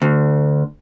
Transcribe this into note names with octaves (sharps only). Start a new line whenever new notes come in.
D2